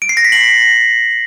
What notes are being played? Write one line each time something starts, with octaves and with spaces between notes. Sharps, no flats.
D7
C7
A#6
B6
F#7